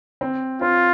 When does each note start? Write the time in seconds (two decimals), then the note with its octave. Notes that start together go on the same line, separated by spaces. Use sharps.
0.21 C4
0.61 C4 F4